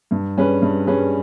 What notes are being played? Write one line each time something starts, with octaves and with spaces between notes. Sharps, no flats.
G2
G3 C#4 G#4 B4
G2
G3 C#4 G#4 B4